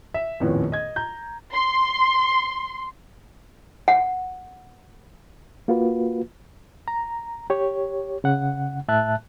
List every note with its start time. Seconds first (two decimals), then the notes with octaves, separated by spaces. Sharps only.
0.14 E5
0.40 D#1 F2 A2 B3 C#4
0.72 D#5 G#6
0.96 A#5 G6
1.54 C6
3.88 F#5
5.68 A#3 F4 F#4 B4
6.88 A#5
7.50 G4 C#5
8.24 C#3 F#5
8.88 A2 E5 A5 F#6